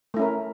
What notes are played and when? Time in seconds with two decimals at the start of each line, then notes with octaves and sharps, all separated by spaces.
0.14 A3
0.17 E4
0.19 C#4
0.22 A#4